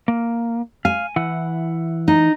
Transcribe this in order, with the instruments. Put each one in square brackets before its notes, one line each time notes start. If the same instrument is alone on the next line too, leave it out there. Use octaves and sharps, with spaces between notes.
[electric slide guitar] A#3
[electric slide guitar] F5 [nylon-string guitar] G#5
[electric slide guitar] E3 E4 F#5
[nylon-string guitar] D#4